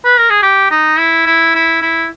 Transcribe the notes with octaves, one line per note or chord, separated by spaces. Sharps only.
B4
A#4
G#4
G4
D#4
E4
E4
E4
E4